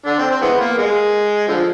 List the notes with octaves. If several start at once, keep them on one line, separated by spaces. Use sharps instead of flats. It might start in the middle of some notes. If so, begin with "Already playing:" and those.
D3 D4
C4
C4
E3 G#3 B3
A#3
G#3
D3 F3